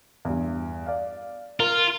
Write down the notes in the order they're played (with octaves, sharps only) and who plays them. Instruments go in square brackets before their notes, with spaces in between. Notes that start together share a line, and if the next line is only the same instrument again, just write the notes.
[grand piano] E2 G2
D5 F5
[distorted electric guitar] F4 [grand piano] A#4